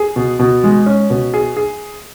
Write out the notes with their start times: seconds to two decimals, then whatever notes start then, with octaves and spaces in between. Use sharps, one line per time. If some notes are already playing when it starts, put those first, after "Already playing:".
Already playing: G#4
0.16 B2
0.39 B2
0.64 G#3
0.86 C#4
1.10 B2
1.34 G#4
1.57 G#4